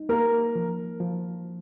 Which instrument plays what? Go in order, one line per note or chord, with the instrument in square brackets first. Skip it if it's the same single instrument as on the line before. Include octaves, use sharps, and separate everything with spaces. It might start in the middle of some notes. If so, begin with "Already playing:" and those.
Already playing: [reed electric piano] D#4
[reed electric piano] A#3 [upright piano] A#4
[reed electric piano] F3
F3